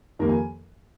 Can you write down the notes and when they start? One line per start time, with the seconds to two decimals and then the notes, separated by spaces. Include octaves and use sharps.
0.19 F2 D#3 G3 A#3 A#4
0.29 G#5